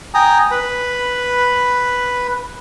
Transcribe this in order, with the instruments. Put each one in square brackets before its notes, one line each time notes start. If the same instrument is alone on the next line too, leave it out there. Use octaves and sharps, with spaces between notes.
[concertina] G5 G#5 A#5 D#6
B4 B5